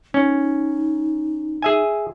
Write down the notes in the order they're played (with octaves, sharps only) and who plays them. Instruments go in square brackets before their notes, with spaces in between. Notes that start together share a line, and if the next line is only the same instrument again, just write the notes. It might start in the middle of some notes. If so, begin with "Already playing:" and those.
[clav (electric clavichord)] C#4 [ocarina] D#4
[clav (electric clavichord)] G#4 E5 G#5